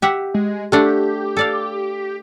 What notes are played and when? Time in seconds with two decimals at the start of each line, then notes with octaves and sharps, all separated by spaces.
0.02 G4 E5 F#5
0.34 G#3
0.72 A3 D4 G4 F#5
1.37 A4 D5 F5